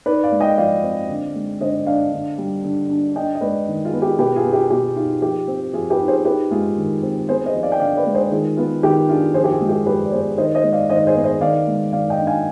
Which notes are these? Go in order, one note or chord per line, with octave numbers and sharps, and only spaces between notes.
D#4 B4 D5
D5 F5
G#3
D#5 G5
F3 D5 F5
C4
D3
G#3
D3 C5 D#5
D4 D5 F5
D3
G3
D3
D4
D4 D#5 G5
D#5
G#3 B4 D5
D#3
F4 G#4
B3
G4
B2 G4 B4
F4 G#4
B3
G4
B2 G4
D#4 F4
F3 G4
C4
F3 F4 G#4
G4 B4
D#4
G#4 C5
D#4 G4 B4
G#3 F4 G#4
D#3
C4
B3 G#4 C5
C5 D#5
F3
D5 F5
G5
D3 D5 F5
B4 D5
G#3
G#4 C5
D#3 F4 G#4
B3 F4
D#3 G4
D4 F4 G#4
F3 G#4 C5
G4
F4 G#4
G#3
G4
F3 G4 B4
D5
B3 G#4 C5
D#3 C5 D#5
C5 D#5
G#3
D5 F5
D#3 C5 D#5
G#4 C5
B3
C5 D#5
D#3 D5 F5
G#3
D#3 D5 F5
D#5 G5
D4
F5 G#5